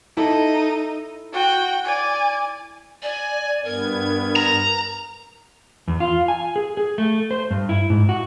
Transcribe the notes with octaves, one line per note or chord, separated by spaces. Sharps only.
D#4 E4 A4
F#4 G5
D5 G#5
D5 G#5
G2 B3 A#4 G#6
A#5
E2
F4
G#5
G#4
G#4
A3
C5
G2
E4
G#2
F#4